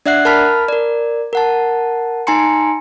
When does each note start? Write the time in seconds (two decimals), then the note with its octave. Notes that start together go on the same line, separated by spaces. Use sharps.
0.06 D4 D5 E5 F#5 F#6 C7
0.25 A#4 A5 B5 F6 B6
0.69 A#4 D5
1.33 A#4 F#5 A5
2.27 D#4 G#5 A#5 C6 C#7